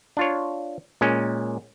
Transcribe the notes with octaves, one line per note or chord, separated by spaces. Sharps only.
D4 F4 C#5
A#2 G#3 C#4